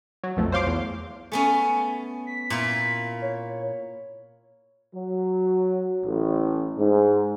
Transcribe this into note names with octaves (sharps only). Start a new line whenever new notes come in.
F#3
B1 F2 A3
C5 C#5 F5 C6 D6
E2
A3 B3 C#4 G#5
B6
A#2 E4 F4
C#5
F#3
A1
G#2